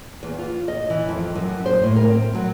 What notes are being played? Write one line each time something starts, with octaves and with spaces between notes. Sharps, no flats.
E2
F4
D#5
E3
F2
F#2
C5
A2
A#4
C4
F#3